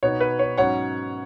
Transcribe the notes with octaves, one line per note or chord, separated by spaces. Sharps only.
B2 B3 D#4 C#5
B4
C#5
G#2 F#3 C#4 C#5 F#5